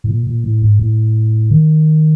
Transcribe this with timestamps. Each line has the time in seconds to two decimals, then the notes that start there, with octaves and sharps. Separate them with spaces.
0.04 A2
0.09 A#2
0.27 A#2
0.44 A2
0.62 G#2
0.79 A2
1.50 D#3